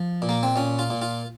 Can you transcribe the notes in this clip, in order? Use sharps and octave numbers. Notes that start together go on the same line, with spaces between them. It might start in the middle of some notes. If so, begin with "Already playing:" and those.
Already playing: F3
A#2
A#3
C4
A#2 C#4
F4
A#2
F4